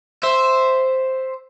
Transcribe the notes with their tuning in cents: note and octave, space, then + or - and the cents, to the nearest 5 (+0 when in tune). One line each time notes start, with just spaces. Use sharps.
C5 +0 E5 +0